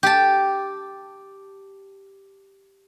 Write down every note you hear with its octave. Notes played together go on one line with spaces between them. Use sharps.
G4 A5